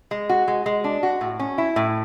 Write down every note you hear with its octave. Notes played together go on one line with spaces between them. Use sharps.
G#3
F#4
G#3
G#3
D4
F#4
A2
C#4
E4
A2